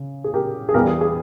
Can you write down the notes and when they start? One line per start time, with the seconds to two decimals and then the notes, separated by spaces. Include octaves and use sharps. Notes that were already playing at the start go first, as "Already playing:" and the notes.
Already playing: C#3
0.24 G#4
0.34 G4 A#4
0.69 G#4
0.74 E2 E3 G3 G4 A#4
0.87 G#4
1.01 G#4